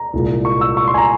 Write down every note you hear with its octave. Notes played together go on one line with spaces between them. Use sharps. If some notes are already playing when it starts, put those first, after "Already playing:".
Already playing: A#5
C2 A#2 G#3
C#6
E6
C#6
C6
G#5
A#5